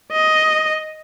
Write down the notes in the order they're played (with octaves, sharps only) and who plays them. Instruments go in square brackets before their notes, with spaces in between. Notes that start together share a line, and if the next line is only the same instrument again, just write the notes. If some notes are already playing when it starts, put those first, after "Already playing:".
[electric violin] D#5